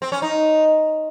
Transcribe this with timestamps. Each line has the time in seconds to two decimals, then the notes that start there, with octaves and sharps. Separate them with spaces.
0.02 C4
0.12 C#4
0.22 D#4